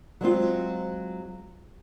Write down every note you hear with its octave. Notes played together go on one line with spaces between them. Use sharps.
F#3 G#3 C4 F4